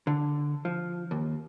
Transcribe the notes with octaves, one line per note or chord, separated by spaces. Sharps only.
D3
F3
D#2